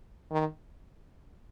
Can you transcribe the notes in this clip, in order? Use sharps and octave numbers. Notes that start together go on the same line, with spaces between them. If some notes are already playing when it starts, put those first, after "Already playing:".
D#3